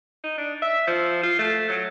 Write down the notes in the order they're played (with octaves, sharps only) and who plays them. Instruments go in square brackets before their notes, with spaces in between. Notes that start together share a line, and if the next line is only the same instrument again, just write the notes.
[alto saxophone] D#4
D4
E5
F3
F4
A3
F#3